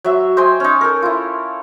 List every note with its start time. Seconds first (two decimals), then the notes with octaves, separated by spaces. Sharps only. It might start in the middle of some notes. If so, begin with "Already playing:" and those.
0.04 F#3 E5
0.37 C5 D#5 G5 G#5
0.60 C#4 D#4
0.81 A4 A#4
1.02 E4 F4